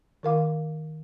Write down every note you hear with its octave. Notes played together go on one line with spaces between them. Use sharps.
D#3 A#4 F5 D6